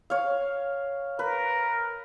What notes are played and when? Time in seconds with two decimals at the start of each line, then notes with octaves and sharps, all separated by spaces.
0.10 C#5 F5
1.19 A#4 B4